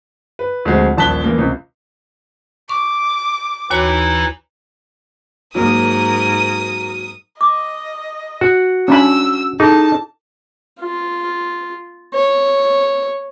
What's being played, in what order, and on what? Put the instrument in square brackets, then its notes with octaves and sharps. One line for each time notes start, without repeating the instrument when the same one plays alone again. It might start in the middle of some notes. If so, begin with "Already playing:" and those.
[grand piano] B4
D2 F3 G#3 C4
D#1 A#1 A5 F#6 B6 G7
E3 A#3
C#2 C3
[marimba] C#6 [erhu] D6
[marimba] D#2 F#4 C#5 [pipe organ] E3 D#4 E4
[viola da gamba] G#2 A#4 [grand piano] F#3 A#3 [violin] D#6 D#7
[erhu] D#5 [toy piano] D6
[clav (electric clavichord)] F#4
[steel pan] C#4 D4 B5 [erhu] E6
[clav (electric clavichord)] D#4 [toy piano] E4 G#4 A4 [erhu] A5
[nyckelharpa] F4
C#5